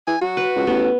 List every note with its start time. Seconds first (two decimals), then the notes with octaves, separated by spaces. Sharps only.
0.07 E3 G#5
0.21 F#3 F#4
0.37 B4
0.55 C#2
0.67 A1 B3